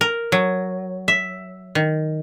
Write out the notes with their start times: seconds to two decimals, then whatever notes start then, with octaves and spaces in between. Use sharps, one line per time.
0.01 A#4
0.32 F#3
1.08 E5
1.75 D#3